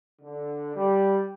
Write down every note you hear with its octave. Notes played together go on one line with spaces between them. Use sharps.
D3
G3